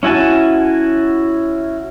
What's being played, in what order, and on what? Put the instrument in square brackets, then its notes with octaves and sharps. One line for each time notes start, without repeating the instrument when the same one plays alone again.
[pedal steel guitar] C#4 E4 F#4 G#5 A5